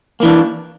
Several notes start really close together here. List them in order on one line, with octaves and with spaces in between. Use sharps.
A#3 E3 D4